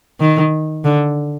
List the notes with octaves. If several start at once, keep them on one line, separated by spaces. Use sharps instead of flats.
D#3
D3